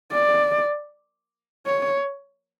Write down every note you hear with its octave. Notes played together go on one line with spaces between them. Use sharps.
D5
C#5